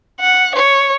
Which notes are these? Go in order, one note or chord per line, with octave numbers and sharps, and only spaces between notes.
F#5
C#5